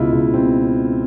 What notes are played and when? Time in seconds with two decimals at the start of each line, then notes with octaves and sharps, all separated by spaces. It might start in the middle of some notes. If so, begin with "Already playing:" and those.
Already playing: C#2 B2 E4 F4
0.12 C#2
0.34 B2 C4